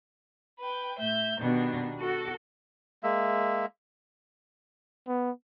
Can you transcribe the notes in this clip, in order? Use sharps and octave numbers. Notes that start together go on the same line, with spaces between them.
B4 G5
A2 E5 G6
B2 D#3 G3 D4
F#4 A4
G#3 A#3 E5
B3